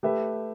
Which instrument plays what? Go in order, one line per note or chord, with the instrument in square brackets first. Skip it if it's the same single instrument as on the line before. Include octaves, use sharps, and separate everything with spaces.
[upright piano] A3 G4 B4 E5